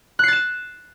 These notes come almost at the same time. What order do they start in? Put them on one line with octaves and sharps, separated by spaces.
F#6 C7 A6 E7